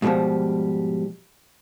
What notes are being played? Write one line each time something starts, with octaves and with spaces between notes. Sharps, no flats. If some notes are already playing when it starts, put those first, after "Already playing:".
G#2 B2 D#3 F3 G3